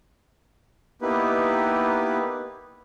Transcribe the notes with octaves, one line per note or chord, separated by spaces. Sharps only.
A#3 B3 D#4 E4 G4 B4